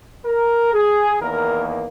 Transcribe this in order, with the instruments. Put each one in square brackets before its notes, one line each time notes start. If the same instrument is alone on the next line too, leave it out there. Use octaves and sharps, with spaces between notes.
[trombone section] A#4
G#4
E2 D#3 A#3 A#4